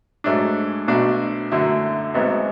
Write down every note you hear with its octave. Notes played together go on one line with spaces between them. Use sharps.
G#2 F#3 A3 D4
B1 B2 A3 D4 F#4
F#2 D3 F#3 A3 E4
G#1 G#2 F#3 B3 E4